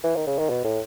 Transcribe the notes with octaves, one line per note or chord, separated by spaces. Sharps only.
E3
D#3
C#3
D#3
B2
A2